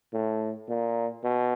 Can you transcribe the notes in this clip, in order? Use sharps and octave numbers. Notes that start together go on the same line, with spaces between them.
A2
A#2
B2